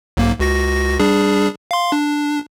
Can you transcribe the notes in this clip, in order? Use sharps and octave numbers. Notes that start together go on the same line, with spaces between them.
B1 G#2 A#3
C#2 F#4 A#6
G3 D4 G#4
F5 C6
D4